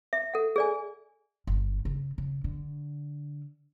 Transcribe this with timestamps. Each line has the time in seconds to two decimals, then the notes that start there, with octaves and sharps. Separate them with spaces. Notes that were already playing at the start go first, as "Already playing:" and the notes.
0.13 E5
0.34 A4 F#5
0.56 G#4 D5 G#5
1.47 G1
1.85 C#3
2.18 C#3
2.44 D3